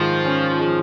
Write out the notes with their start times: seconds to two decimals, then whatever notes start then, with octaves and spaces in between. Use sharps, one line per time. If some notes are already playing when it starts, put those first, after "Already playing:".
Already playing: G#2 D#3 F3 G#3
0.25 C#4
0.59 G#3